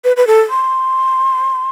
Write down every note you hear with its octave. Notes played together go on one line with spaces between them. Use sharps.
B4
B4
A4
C6